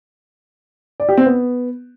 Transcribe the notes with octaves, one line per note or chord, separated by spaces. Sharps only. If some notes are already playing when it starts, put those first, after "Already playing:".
D5
G4
C4
B3